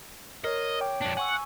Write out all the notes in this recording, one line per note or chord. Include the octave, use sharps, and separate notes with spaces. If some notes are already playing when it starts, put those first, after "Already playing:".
A#4 C#5 D#5
C#5 G5 D6
F2 D4
F#5 G#5 C#6 E6